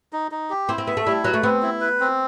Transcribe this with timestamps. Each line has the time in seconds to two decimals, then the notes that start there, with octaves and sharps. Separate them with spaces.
0.13 D#4
0.31 D#4
0.50 G4
0.68 C4 E4
0.78 C4
0.87 B3 E5
0.97 A3
1.06 G3 E4
1.24 F#3 B4
1.34 A3
1.43 B3 C4
1.62 E4
1.81 B4
2.00 C4